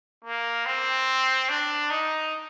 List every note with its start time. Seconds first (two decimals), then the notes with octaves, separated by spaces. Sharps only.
0.24 A#3
0.66 C4
1.49 D4
1.90 D#4